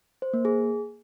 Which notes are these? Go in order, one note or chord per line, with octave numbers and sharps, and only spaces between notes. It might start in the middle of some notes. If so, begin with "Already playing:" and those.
C5
A#3
G#4